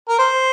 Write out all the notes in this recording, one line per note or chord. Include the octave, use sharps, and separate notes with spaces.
A#4
C5